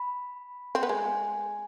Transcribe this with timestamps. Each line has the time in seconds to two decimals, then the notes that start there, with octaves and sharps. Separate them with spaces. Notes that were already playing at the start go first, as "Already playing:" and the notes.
Already playing: B5
0.75 C4
0.83 B3
0.89 G#3 G#5